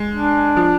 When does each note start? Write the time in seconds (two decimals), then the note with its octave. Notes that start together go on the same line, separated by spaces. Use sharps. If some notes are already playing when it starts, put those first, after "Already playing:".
Already playing: G#3
0.13 D4
0.57 F3